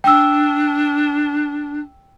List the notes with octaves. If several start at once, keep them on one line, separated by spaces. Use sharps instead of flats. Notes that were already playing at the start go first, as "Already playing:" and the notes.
D4 G5 E6